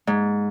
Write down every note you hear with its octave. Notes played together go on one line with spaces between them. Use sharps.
G#2